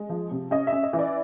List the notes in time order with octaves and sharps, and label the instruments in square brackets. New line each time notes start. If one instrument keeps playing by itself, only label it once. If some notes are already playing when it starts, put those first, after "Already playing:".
Already playing: [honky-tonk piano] G#3
F3
C3
C#4 D#5
E5
C#4
D#5
E3
D5